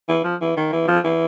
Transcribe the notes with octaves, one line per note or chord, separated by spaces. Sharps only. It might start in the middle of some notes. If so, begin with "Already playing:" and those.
E3
F3
E3
D#3
E3
F3
E3